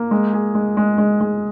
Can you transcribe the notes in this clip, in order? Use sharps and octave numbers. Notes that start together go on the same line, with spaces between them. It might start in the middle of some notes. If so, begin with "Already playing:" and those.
Already playing: A#3
G#3
G#4
G#3
G#3
G#3
G#3